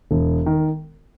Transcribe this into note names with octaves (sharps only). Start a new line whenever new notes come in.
E1
D#3